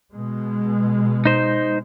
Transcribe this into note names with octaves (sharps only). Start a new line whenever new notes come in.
B2 G#3
D#4 C5